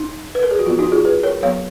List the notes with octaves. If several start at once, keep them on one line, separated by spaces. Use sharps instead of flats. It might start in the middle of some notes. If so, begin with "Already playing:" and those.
Already playing: D#4
B4
A#4
G#4
F#4
F3 B3 F4
D#4 F#4
F4 G#4
G#4 B4
A#4 C#5
F#3 B3 C#5 F5